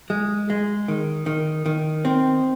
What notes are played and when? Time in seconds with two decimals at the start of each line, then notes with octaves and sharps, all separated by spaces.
0.10 G#3
0.50 G#3
0.88 D#3
1.26 D#3
1.66 D#3
2.05 C4